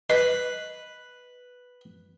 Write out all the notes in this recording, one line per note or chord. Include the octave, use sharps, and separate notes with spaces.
B4 D#5